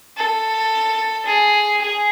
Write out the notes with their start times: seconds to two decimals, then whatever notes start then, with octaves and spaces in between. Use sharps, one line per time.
0.17 A4
1.26 G#4
1.81 G#4